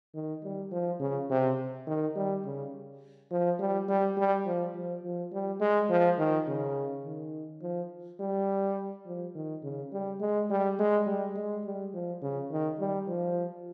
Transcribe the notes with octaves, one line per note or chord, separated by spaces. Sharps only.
D#3
G3
F3
C#3
C3
D#3
G3
C#3
F3
G3
G3
G3
F3
F3
F3
G3
G#3
F3
D#3
C#3
D#3
F3
G3
F3
D#3
C#3
G3
G#3
G3
G#3
G3
G#3
G3
F3
C#3
D#3
G3
F3